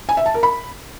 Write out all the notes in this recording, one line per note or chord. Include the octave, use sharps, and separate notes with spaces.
G#5
E5
A5
A#4
B5